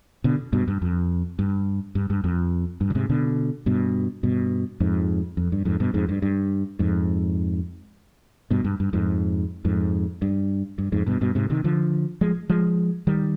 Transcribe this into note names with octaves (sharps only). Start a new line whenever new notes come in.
B2 D3
G2 B2
G2
F2
G2
G2
G2
F2
G2
D3
G#2 C3
B2 D3
G2 B2
G2 B2
F2 G#2
F2
G2
F2 G#2
G2 B2
F2 G#2
G2
G2
F2 G#2
G2 B2
G2
G2
F2 G#2
F2 G#2
G2
G2
F2 G#2
G2 B2
G2 B2
G#2 C3
C3 D#3
D3 F3
F3 G#3
F3 G#3
D#3 G3